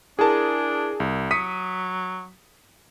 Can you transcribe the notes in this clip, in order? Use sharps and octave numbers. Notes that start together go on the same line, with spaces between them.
D4 E4 G#4 A#4 A5
C2
F#3 D#6 B6 C#7 D#7